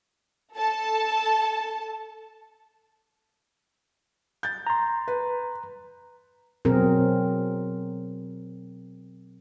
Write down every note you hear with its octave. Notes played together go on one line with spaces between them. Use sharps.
A4 A5
G6 A6
A#5 C6
B4
B2 F#3 C4 G#4 A#4